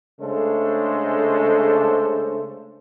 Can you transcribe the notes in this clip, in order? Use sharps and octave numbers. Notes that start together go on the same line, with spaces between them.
C#3 G#3 A3 D4 A4 C5